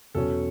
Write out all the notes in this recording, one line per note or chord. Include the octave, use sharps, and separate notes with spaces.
E2 B2 F#3 C#4 A4